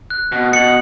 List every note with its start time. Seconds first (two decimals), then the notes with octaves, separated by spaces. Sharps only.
0.10 F#6
0.32 B2
0.53 B2 C#7 F#7